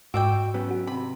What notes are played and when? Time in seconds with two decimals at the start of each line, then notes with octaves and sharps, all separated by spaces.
0.14 G#2 B2 F#4 D5 G5 E6 D7
0.54 F#3 B3 C#4
0.71 F#4
0.87 C3 B5